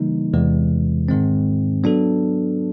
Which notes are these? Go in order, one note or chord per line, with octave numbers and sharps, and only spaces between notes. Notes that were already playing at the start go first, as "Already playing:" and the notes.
Already playing: C#3 E3 G3 A#3 D#4
E2 C3 E3 G#3
G#2 D#3 G#3 C4
F#3 B3 D4 F#4 A4